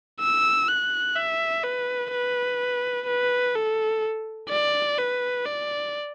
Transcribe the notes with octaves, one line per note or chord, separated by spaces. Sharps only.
E6
F#6
E5
B4
B4
B4
A4
D5
B4
D5